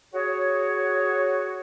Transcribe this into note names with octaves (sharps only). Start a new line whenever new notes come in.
F#4 G#4 C#5